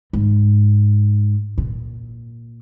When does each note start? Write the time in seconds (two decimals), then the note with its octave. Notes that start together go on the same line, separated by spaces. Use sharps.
0.13 G#2
1.58 A#2